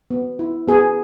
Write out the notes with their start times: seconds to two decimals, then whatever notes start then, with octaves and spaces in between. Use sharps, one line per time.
0.11 B3
0.39 E4
0.68 B3 G#4